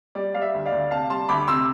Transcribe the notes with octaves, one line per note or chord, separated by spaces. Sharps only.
G3 D5
G3 F5
E5
D2
D5 F5
D2
C3 F5 A5
G3 A5 C6
D2 B5 D6
C3 C6 E6